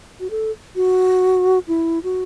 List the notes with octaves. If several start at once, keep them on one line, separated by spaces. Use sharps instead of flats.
F#4
A4
F#4
E4
F#4